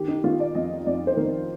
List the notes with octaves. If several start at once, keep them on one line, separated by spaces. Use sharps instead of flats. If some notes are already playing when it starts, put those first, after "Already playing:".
Already playing: D#3 G4
D#4
D#3 F4
D5
F2 D#5
F2 D5
C5
D#3 A#4